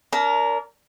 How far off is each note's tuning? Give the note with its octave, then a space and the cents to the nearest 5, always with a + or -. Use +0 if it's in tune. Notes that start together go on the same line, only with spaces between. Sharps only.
D4 -35 A#4 +0